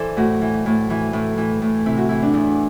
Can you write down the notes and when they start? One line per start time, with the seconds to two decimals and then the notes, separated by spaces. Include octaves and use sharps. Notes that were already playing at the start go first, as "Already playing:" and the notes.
Already playing: E3 A4 C5 D5
0.17 A2 F#4
0.41 E3
0.66 A2
0.90 E3
1.13 A2
1.38 E3
1.62 A2
1.86 C3 E4
1.97 F#4
2.09 E3 E4
2.22 D4
2.34 E2